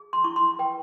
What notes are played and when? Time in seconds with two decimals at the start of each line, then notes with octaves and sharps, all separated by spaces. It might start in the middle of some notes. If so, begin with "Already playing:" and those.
Already playing: G#4
0.13 C6
0.24 E4 C#6
0.36 C6
0.59 B4 G5